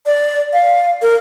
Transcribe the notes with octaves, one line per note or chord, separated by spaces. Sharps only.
D5
F5
A#4